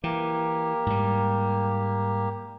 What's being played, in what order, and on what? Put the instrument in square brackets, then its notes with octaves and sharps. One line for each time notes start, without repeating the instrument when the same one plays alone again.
[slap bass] E3 [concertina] A#3 G4
[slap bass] G#2 G3